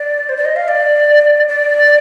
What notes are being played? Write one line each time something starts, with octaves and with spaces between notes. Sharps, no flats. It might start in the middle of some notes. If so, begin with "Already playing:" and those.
Already playing: D5
C5
D5
D#5
F5
D5
D5